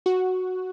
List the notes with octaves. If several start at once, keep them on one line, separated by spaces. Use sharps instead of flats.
F#4